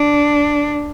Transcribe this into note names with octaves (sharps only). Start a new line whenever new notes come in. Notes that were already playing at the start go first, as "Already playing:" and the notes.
Already playing: D4